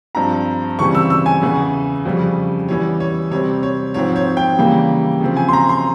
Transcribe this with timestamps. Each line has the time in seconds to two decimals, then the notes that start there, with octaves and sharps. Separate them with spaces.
0.15 G2 F3 C4 A#5
0.79 C#3 E3 G3 C4 C#6
0.95 E6
1.10 E6
1.26 G#5
1.42 E2 C#3 E3
2.05 F2 C#3 G3 C#4
2.68 E2 E3 G3 C#4 C#5
3.00 C#5
3.31 C3 G3 C4 C#5
3.63 C#5
3.94 G#2 F3 C4 C#5
4.16 C#5
4.37 G5
4.58 C#3 E3 G3 A#3
5.21 C#3 F3 C4
5.37 G#5
5.48 C6
5.53 A#5
5.69 C6